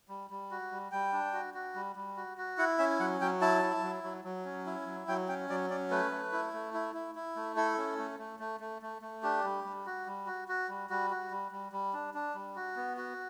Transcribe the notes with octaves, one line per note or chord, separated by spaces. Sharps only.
G3
G3
F#4
G3
G3 G5
D4
F#4
F#4
G3
G3
F#4
F#4
E4 F#5
C#4 E5
F#3 F#5
F#3 G5
E4 A5
E4
F#3
F#3
F#3
C#4
E4
F#3
F#3 G5
C#4 G5
F#3 D5
C#4 D5
A3 B4
A3
E4
A3
E4
E4
E4
A3
E4 A4
C#4
A3
A3
A3
A3
A3
A3
D4 G4
G3
G3
F#4
G3
F#4
F#4
G3
G3 F#4
F#4
G3
G3
G3
D4
D4
G3
F#4
B3
F#4